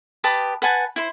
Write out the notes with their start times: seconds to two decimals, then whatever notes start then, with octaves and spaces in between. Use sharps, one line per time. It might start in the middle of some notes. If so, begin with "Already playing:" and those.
0.24 G4 B4 A5 D#6
0.62 B4 F#5 G#5 A5
0.96 E4 C5